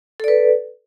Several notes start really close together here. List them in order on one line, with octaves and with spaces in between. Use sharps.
A4 D5 B4